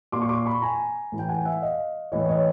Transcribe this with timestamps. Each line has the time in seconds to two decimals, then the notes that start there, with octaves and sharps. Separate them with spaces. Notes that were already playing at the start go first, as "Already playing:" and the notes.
0.12 A#2 C6 D6
0.22 C#6
0.29 C6 D6
0.46 B5 C#6
0.62 G#5 A#5
1.12 A2 E3
1.19 G5
1.29 F#5 G#5
1.45 E5 F#5
1.62 D#5 F5
2.12 A2 E3 C#5 D#5
2.29 C#5 D#5